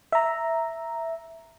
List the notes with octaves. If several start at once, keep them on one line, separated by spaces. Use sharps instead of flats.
E5 A#5